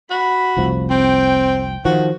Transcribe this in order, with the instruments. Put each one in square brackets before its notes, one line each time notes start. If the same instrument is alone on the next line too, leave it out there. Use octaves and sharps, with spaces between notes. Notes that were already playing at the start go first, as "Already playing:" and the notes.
[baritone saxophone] F#4 [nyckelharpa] B5
[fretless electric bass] F1 C2 F3
[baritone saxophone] C4 [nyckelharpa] G5
[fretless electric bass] D#3 F3 [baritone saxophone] F#4